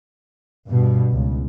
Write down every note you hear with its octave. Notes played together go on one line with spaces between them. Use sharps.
G2 B2
C#2